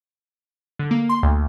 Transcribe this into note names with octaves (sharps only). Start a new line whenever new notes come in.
D3
A#3
C6
D2